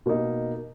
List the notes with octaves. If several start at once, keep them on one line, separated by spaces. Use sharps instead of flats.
B2 A#3 D#4